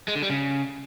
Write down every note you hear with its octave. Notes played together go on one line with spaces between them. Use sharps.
G#3
D3
G3
C#3